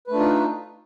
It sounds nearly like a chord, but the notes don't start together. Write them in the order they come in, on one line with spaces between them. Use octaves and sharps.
B4 A3 D4 F4 D#4